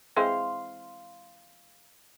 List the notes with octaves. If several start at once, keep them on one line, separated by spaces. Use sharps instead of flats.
E3 G#3 C4 F5 C6